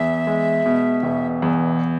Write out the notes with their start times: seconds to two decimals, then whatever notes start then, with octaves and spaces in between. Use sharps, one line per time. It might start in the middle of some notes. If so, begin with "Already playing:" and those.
Already playing: E2 E5
0.27 G#3
0.66 B2
1.03 E1
1.42 E2